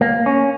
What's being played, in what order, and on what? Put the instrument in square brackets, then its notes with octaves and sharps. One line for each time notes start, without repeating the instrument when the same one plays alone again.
[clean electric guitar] A#3
C#4